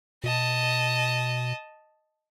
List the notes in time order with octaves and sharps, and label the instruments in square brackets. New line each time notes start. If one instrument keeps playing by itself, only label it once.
[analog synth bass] B2 [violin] D#5 A5